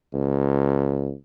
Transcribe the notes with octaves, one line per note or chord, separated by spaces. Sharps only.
C#2